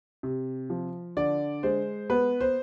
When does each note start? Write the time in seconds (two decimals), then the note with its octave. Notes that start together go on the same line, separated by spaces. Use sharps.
0.23 C3
0.70 F3
1.17 D3 D5
1.63 G#3 C5
2.10 B3 B4
2.41 C5